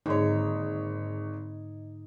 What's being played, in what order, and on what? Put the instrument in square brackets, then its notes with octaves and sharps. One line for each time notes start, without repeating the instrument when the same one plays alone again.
[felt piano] G#1 G#4 C#5 [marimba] G#2 D3 A#3 [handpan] D#4